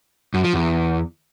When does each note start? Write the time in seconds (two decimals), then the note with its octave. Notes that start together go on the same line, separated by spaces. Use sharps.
0.34 F#2
0.44 F3
0.54 E2